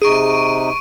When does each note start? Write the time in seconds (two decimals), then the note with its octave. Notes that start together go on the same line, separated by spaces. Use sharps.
0.02 C3 D#4 G#4 C#6 D7 D#7